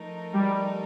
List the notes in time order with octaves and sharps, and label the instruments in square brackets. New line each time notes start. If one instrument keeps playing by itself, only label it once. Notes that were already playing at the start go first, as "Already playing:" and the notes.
Already playing: [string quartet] F3 A3 D#4 A#4
[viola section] G3